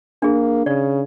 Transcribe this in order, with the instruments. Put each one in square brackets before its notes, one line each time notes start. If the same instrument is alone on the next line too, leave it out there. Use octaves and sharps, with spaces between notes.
[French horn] A#3 [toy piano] D4 G#4
[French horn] C#3 [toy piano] D5